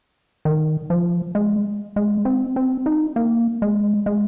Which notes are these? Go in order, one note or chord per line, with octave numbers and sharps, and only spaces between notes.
D#3
F3
G#3
G#3
C4
C4
D#4
A#3
G#3
G#3